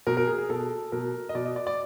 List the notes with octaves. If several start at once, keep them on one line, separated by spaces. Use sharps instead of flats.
B2 A#4
A#4
G#4
G#4
B2 A4
B2 A#4
D#5
B2 D5
D#5
D5
D5